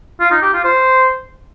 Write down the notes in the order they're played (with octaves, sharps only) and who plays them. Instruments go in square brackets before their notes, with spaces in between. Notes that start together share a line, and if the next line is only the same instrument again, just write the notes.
[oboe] F4
D#4
G4
F4
C5